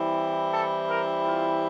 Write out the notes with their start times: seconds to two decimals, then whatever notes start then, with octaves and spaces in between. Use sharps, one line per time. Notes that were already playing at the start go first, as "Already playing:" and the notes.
Already playing: E3 G3 C4 E4
0.52 A4
0.89 A#4
1.26 F4